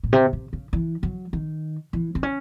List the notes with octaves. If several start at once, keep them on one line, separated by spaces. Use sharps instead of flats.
A2
C3
C3
C#3
E3
F#3
D#3
E3
C4
C#4